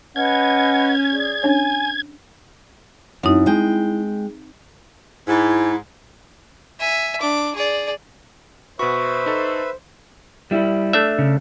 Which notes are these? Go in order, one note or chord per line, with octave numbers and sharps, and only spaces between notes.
C#4 B4 D#5 F#5 G#6
G#4 D5
C#4 D4 C#5 G#5
F#2 C4 D#4 E4
G#3 G5
G#2 E4
E5 G#5
D4 D6
G#4 D5
B2 F#4 B4 C5 E5 B5 C#6
D#4 A4
G3 E4
A3 D4 E5
C#3